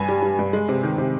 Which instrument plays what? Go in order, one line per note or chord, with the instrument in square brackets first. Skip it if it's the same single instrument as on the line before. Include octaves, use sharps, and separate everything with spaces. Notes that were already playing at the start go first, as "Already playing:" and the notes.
Already playing: [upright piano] G2 G#5
G3
G3
G2
G#3
C3
D#3
C3